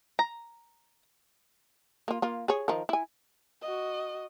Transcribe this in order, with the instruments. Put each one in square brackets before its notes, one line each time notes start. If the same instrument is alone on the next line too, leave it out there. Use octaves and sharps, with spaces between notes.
[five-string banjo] A#5
[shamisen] A#3 F4
A#3 F4
G#4 C#5
D#3 F3 A#4
E4 G#5
[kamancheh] F#4 D#5